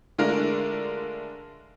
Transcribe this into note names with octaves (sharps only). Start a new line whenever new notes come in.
D3 G#3 A3 D4 F4 A#4